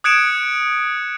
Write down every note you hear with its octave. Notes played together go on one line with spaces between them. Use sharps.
D#6 F#6 G#6 C#7 D7 E7